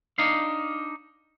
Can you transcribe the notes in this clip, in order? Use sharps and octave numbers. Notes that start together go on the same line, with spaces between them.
D4 D#4 F5